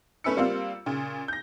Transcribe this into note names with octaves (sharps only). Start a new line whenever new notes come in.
A3 C#4 B4 E5 E6 C#7
G3 A#3 C4 F4
A#2 C#3
G6 A#6